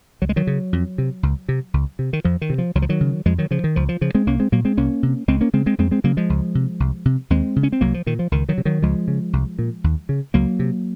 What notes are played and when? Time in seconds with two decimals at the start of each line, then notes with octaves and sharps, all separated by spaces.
0.22 C#2 F#3
0.29 G#3
0.36 D#3 F#3
0.47 C#3
0.73 F2
0.98 C3
1.23 C#2
1.49 C3
1.74 C#2
1.99 C3
2.13 D#3
2.24 F2 F3
2.41 D#3
2.50 C3
2.58 F3
2.75 C#2 F#3
2.82 F3
2.89 D#3 F#3
3.01 C#3
3.26 F2 F3 G#3
3.38 D#3 F#3
3.51 C#3 F3
3.64 D#3
3.76 C#2 F3
3.89 F3
4.01 C#3 F3
4.15 G#3 C4
4.27 C2 A#3 C#4
4.40 G#3 C4
4.52 A#2 F#3 A#3
4.65 G#3 C4
4.77 C2 A#3 C#4
5.03 C3
5.28 C#2 G#3 C4
5.41 A#3 C#4
5.53 C#3 G#3 C4
5.66 G#3 C4
5.78 F2 G#3 C4
5.91 G#3 C4
6.04 C#3 F#3 A#3
6.17 F3 G#3
6.30 C#2
6.55 C3
6.80 C2
7.05 C3
7.30 D#2 G#3 C4
7.56 C#3
7.63 C#4
7.72 C4
7.81 C2 F#3 A#3
7.94 F3
8.06 A#2 D#3
8.19 F3
8.32 C#2 D#3
8.49 D#3 F#3
8.58 C3
8.65 D#3 F#3
8.82 C#2 F3 G#3
9.08 C#3
9.33 C2
9.59 A#2
9.84 D#2
10.09 C#3
10.34 C#2 F#3 A#3
10.59 C3